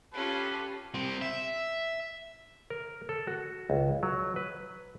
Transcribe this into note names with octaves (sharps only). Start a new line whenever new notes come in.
C#4 F4 G4 A4 B4
C2 C4
E5
A#4
A4
F#4
C#2
F#3
B4